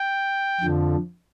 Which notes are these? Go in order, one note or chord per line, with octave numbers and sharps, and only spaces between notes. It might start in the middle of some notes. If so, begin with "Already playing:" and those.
Already playing: G5
F2 D3 F3